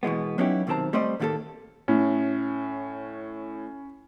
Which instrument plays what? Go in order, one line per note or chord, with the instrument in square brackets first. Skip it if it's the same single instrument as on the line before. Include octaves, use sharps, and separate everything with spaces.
[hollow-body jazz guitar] B2 E3 G#3 B3
F#3 B3 C#4 D#4 E4 G4
B1 C3 D#3 C4 A5 A#5
G3 A3 C4 C5 D5 D#5
A2 D#3 A#3 B3 G4 A4
[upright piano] A2 [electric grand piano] C#4